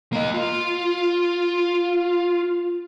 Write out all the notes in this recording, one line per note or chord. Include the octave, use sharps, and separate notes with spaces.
A#3 D#5
F4